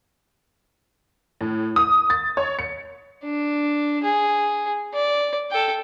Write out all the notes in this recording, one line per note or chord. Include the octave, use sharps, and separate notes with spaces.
A2
D#6
A6
C#5
C#7
D4
G#4
D5
A4 G5